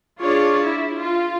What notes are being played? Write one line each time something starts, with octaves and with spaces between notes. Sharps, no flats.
D4 F4 G#4 C#5 D5
E4
F4